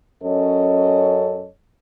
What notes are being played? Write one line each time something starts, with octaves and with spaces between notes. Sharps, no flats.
F#2 C#4 A4 C#5 D#5